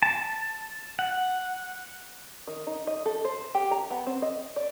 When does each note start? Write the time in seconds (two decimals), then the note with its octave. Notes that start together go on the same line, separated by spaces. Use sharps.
0.03 A5
0.99 F#5
2.47 D#3
2.67 D#4
2.87 D#5
3.06 A4
3.25 C5
3.55 G4
3.71 A#5
3.90 B3
4.07 C4
4.22 D#5
4.56 D5